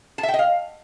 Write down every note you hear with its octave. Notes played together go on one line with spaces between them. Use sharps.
A5
E5
G5
D#5
F5